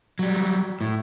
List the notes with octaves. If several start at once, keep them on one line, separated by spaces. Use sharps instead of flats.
F#3 G3
A2